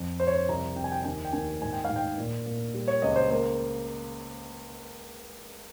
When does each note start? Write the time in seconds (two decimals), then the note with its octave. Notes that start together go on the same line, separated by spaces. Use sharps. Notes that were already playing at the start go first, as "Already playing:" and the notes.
Already playing: F2
0.20 F2 C5
0.27 C#5
0.35 C5
0.49 C2 A#5
0.76 C2 G5
0.84 G#5
0.92 G5
1.04 D#2 G#5
1.25 G5
1.33 D#2 G#5
1.62 G#2 G#5
1.73 G5
1.84 G#2 F5
1.96 G5
2.18 A#2
2.46 A#2
2.74 G3
2.88 C#5
3.02 C#2 D#5
3.16 C5
3.30 A#3 C5